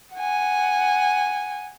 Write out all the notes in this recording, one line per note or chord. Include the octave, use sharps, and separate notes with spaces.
F#5 G#5